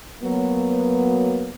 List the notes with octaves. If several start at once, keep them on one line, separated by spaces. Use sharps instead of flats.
F#3 A#3 B3